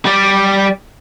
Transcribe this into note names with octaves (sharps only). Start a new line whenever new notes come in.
G3 D5